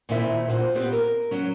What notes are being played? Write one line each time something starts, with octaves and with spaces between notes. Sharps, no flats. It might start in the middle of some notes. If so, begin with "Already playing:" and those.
A#2 D#3 C4 E4 E5
A#2 F#4 C5
B3 C4 G4 C5
A#4
F#3 C#4